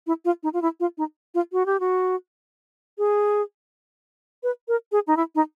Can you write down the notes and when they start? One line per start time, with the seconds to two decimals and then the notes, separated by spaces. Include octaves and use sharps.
0.07 E4
0.25 F4
0.43 D#4
0.53 F4
0.62 E4
0.80 F4
0.98 D#4
1.35 F4
1.52 F#4
1.66 G4
1.80 F#4
2.98 G#4
4.43 B4
4.68 A#4
4.92 G#4
5.07 D#4
5.17 E4
5.35 D#4